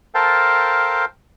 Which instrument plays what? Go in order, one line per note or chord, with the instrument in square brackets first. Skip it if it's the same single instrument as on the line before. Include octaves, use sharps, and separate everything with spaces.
[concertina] A4 A#4 C5 F5 G5 A5